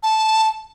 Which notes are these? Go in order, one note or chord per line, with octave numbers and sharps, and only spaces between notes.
A5